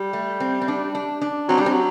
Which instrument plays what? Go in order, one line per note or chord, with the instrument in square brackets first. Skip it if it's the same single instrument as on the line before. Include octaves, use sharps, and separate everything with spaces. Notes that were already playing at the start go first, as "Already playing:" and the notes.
Already playing: [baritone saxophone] G3
[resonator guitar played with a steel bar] A3
C4
C4
D4
D4
D4
[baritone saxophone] F#3 [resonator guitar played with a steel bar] C4
[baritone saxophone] G3 [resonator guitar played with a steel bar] D4
[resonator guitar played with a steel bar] C4
[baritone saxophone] F#3